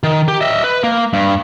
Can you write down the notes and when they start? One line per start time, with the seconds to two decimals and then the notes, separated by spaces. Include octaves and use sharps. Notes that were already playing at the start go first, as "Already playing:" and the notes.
0.03 D#3
0.28 G4
0.41 D#5 E5
0.64 B4
0.84 A#3
1.13 G2